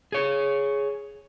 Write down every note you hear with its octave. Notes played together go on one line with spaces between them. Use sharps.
G#4 C#5